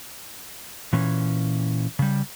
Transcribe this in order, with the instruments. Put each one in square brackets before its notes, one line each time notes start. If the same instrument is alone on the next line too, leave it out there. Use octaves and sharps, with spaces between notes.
[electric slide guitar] A#2 E3 C#4
C#3 G3